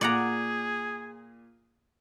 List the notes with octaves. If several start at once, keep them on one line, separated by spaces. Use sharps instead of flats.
A#2 G#4 D5 F#5 A#5